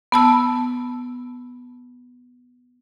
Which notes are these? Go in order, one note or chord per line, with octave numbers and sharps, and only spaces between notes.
B3 A5 E6